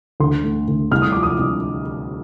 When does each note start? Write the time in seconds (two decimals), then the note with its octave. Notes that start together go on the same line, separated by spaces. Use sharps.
0.20 D2 C6
0.44 A3
0.68 D2
0.91 C2 F6
1.02 D#6
1.12 F3 D6
1.23 D#6
1.39 C2